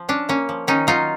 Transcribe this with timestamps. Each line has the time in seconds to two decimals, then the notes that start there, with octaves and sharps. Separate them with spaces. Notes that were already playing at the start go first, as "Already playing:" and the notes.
Already playing: F3
0.09 C#4 D4
0.29 A#3 C#4
0.49 F3
0.67 D#3 C#4 D#4
0.87 F#3 D#4 F4